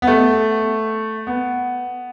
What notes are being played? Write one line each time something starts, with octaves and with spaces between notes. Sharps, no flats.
B3
A3
B3